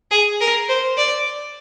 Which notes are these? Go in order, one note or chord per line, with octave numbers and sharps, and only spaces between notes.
G#4
A#4
C5
D5